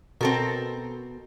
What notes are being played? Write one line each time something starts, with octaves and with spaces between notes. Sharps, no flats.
B2 C4 A4 A#4